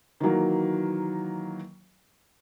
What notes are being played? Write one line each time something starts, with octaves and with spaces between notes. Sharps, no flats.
D#3 E3 F#3 A#3